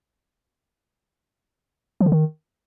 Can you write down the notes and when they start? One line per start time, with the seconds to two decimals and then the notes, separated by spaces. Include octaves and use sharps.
2.01 F3
2.06 D3
2.12 D#3